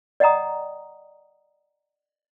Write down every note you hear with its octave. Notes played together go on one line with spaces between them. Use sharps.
D5 D#5 F#5 G5 A#5 D#6